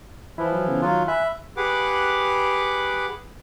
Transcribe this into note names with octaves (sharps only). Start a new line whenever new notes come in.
E3 F3 E4
F#3 E4
C#3 B3 C#4
D#3 F#3 F4
E5 G#5 B5 F#6
G4 G#4 B4 F#5 D6